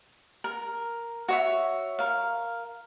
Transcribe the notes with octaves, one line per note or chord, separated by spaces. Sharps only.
A#4
F#4 C#5 E5
A#4 F5